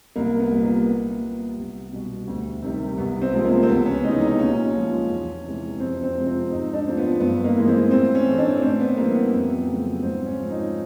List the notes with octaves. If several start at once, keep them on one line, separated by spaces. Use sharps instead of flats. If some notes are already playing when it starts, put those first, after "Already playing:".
C2 A#3
B3
A#2 G3
A#3
A#2 B3
G3
C2
B2 G3
D2
C3 D#3 G3
C2 B3
C4
C3 F3 G#3
A#3
C4
C#2 B3
C#4
C3 E3 G#3 D#4
D#4
A#2 C#4
F3 G#3
E2
C3 E3 G#3
F2 C4
C4
C3 F3 G#3
C4
G#2 D#4
D4
F3 A3 C4
B3
G2 B3
A#3
E3 G#3
C4
A2 C4
C#4
E3 A3
D4
A2 C4
B3
E3 G3 A#3
B3
F2
C#3 F#3 A3
G#2 C4
C#4
F3 G#3
D#4